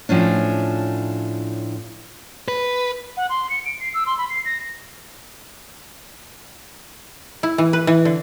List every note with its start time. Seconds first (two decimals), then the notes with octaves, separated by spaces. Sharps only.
0.09 A2 F3 C#4 D4
2.48 B4
3.17 F#5
3.29 C6
3.50 C#7
3.65 D7
3.80 C7
3.94 E6
4.06 C6
4.18 B5
4.30 C7
4.45 A#6
7.43 E4
7.58 E3
7.73 B4
7.87 E3
8.05 D3